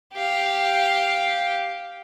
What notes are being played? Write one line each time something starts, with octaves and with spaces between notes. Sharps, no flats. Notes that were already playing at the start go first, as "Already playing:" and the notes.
G4 F5